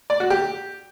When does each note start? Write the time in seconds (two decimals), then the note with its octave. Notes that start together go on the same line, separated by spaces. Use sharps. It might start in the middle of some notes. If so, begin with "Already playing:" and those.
0.10 D5
0.20 F#4
0.30 G4